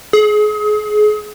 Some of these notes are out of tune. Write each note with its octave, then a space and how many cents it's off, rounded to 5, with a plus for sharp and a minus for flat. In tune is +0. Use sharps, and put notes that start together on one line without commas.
G#4 +30